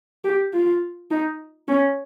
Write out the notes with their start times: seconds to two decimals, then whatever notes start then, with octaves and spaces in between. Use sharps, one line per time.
0.24 G4
0.53 F4
1.11 D#4
1.68 C#4